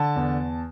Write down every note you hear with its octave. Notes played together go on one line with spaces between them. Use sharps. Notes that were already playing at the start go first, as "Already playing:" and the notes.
Already playing: D3 A5
E2